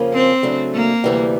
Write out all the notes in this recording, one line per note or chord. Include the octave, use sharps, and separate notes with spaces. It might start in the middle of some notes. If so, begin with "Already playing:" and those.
Already playing: F2 C#3 F3 A#3 C#4
C4
C#3 F#3 A3 D4
A#3
D2 C3 E3 G3